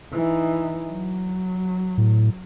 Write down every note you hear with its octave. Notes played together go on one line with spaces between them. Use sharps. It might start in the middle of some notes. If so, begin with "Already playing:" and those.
E3 D#4
F#3
A2